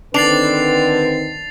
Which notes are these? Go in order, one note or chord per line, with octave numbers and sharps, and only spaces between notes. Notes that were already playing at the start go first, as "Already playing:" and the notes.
D3 D#3 C4 D4 B4 A6 C7 F7